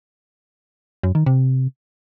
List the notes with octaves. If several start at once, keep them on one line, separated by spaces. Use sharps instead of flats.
F#2
D#3
C3